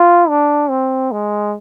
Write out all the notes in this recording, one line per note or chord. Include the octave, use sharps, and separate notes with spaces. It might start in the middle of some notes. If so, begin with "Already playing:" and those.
Already playing: F4
D4
C4
G#3